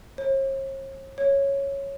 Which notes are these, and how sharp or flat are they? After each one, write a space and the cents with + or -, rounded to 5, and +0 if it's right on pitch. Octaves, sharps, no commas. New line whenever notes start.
C#5 -45
C#5 -5